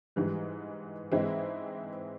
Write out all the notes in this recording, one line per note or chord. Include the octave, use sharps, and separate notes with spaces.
G#2 E3 G3
G#2 E3 G#3 C4 E4